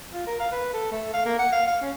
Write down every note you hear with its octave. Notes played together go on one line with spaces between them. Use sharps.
F4
A#4
F5
B4
A4
A3
F5
A#3
F#5
F5
F5
C#4